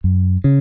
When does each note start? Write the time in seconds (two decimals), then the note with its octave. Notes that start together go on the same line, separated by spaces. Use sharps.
0.04 F#2
0.44 C#3